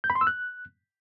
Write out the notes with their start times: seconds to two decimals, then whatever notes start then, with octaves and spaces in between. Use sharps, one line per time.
0.04 G6
0.10 B5
0.15 C6
0.21 E6
0.27 F#6